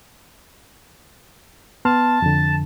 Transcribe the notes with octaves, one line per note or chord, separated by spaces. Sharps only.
B3 A5 C6 F6
F2 D3